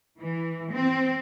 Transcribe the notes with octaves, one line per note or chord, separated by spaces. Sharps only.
E3
C4